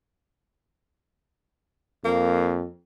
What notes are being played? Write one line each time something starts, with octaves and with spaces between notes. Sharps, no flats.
F2 A#3